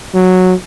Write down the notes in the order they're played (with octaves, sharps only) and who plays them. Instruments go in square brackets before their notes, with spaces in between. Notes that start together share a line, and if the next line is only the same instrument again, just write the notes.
[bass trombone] F#3